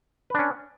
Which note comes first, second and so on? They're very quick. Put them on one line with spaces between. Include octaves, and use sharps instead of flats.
B4 D4 C#4